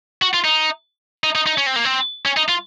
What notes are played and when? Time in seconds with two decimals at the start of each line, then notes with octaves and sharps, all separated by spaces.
0.22 F#4
0.34 F4
0.44 D#4
1.24 D#4
1.35 D#4
1.46 D#4
1.58 C#4
1.66 C4
1.76 A#3
1.85 C4
2.26 C#4
2.37 D#4
2.49 F4